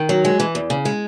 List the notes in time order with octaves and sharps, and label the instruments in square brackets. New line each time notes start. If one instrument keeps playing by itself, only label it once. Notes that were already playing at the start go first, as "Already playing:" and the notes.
Already playing: [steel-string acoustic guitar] D#3
F#3
G#3
E3
E2
C#3
G#3